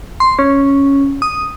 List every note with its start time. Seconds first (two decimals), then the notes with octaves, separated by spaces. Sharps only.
0.20 C6
0.39 C#4
1.22 D#6